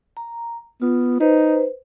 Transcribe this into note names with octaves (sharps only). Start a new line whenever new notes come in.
A#5
B3 F4
D#4 B4 C5